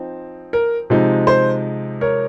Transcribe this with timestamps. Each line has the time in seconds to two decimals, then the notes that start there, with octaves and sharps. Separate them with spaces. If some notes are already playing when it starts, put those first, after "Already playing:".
Already playing: F3 C4 D#4
0.53 A#4
0.90 C3 F3 G#3 D#4
1.27 C5
2.01 A#4 C#5